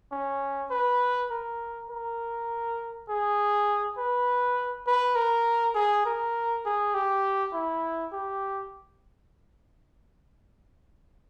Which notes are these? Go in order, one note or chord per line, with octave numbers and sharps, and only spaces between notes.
C#4
B4
A#4
A#4
G#4
B4
B4
A#4
G#4
A#4
G#4
G4
E4
G4